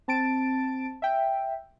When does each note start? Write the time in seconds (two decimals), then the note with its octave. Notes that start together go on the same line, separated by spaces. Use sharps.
0.08 C4 A5 A6 D7
1.02 E5 G5